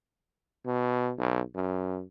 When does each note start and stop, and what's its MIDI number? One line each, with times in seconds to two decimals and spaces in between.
0.66 1.12 47
1.18 1.41 35
1.55 2.03 42